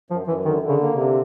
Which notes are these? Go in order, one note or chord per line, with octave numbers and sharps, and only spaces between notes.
F#2 F3
F#2 E3
D3 D#3
D3
C#3
A#3
C3
D3